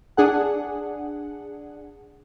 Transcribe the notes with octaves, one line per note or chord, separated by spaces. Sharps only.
D4 G#4 F#5